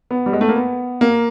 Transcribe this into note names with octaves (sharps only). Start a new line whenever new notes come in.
B3
G3
G#3
A3
A#3
B3
A#3